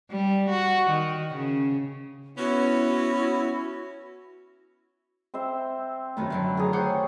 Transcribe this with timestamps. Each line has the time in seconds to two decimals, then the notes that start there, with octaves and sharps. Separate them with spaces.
0.11 G3
0.49 F#4
0.89 D#3
1.35 C#3
2.38 B3 C#4 E4 F#4
5.34 C4 C5 E5
6.17 F#2 D#3 A3 B4 B5
6.30 F#2 D3 F#3
6.57 D#3 F4 G#4 A4 A#5
6.73 G4 C5 C#5 F#5